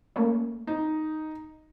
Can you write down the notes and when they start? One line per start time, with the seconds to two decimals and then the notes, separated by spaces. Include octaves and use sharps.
0.16 A3 A#3 C#4
0.67 D#4